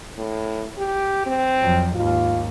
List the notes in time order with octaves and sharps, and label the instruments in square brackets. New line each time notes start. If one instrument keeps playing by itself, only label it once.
[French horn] A2
G4
C4
[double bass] F2 F#3
[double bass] D#2 G#2 [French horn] F4